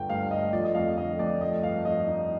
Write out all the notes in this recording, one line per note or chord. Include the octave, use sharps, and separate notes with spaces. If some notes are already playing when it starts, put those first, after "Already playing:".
Already playing: G1 D3 G5
G2 F5
A3 D#5
F3 D5
D#5
F2 F5
D3 D#5
F2 D5
A3 D#5
G2 F5
F3 D#5
D#4